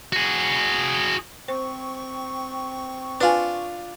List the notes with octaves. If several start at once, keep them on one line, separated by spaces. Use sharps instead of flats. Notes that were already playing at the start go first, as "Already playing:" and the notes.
F#4 G#4
C4 C5 C#6
D4 F4 B4 G#5